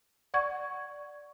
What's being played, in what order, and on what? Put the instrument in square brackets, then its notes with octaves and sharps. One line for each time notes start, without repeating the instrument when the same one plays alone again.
[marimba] D5 F#5 C#6 G#6